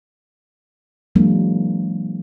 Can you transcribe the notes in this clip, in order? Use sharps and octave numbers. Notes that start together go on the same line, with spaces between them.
E3 F#3 G#3 A#3 D4